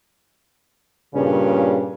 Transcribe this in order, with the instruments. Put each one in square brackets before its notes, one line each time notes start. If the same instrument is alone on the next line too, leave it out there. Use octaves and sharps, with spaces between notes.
[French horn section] G2 A#2 C#3 [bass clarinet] C#4